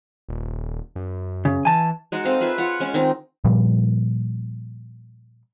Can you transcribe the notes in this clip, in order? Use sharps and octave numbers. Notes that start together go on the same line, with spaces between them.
D#1
F#2
C#3
E3 G#5 A5
G#3 D#4 F#4
C4 A4 D#5 F5
F4 G#4 B4 E5
F4 C#5 F#5
G#3 C#4
D#3 C4 D#4
A#2 F3 G3